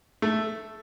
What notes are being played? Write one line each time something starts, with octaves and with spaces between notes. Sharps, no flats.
A3